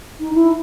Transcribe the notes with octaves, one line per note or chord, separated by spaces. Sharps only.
D#4
E4